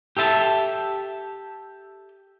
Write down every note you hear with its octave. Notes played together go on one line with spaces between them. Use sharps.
G4 A4 E5 A5